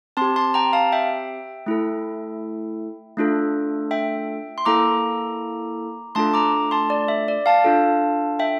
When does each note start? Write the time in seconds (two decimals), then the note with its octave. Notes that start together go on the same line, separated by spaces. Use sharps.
0.17 C4 G4 A5 C6
0.36 A5 C6
0.54 G5 A#5
0.73 F5 A5
0.92 E5 G5
1.66 A3 E4 A4
3.17 A3 D4 F4 A4
3.91 E5 G5
4.58 C6
4.65 A#3 E4 A4 A#5 D6
6.15 A3 D4 F4 A4 A5 C6
6.34 A#5 D6
6.71 A5 C6
6.90 D5
7.08 E5
7.28 D5
7.46 F5 A5
7.64 D4 F4 A4
8.39 E5 G5